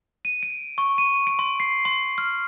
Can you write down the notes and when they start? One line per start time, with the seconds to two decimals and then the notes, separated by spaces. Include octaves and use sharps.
0.25 D#7
0.43 D7
0.78 C#6
0.98 D#7
1.27 D7
1.39 C6
1.60 C7
1.85 C6
2.18 F6